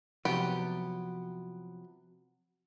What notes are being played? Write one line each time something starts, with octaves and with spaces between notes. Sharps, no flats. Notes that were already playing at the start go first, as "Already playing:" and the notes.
C3 F3 F#3 B3 G4